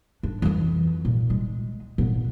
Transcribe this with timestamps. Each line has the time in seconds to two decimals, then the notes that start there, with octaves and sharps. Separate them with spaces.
0.23 D4
0.42 F2 E3
1.05 A#2
1.30 G#3
1.98 A#2 B3